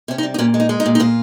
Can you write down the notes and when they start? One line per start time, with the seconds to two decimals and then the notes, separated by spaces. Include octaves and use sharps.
0.08 C3 C#4
0.18 D#4
0.23 G3
0.34 D#4
0.38 A#2 C#4
0.54 G#3
0.60 D#4
0.69 G#3
0.80 D#4
0.86 A#2
0.95 D#4
1.00 A#2 F4